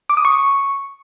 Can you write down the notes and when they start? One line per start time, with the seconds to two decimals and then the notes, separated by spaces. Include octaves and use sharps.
0.10 D6
0.17 D#6
0.25 C#6